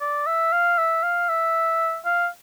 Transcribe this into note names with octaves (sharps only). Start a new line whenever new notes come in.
D5
E5
F5
E5
F5
E5
F5